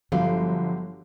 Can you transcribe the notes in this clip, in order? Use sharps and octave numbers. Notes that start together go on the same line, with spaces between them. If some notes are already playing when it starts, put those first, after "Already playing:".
G1 F3 F#3 G4 F5